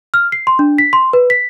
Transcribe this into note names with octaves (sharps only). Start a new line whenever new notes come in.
F6
C7
C6
D4
B6
C6
B4
B6